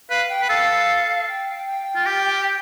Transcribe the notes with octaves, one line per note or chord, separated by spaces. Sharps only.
B4 F5
G5
B4
G5
A4 F5
G5
G5
F4
G4